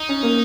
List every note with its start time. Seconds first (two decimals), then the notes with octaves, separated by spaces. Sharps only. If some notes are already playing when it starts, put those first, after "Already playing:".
Already playing: D#4
0.09 C#4
0.23 A#3